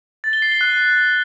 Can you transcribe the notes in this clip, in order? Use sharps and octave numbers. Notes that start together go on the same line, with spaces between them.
A6
G7
C7
G7
F#6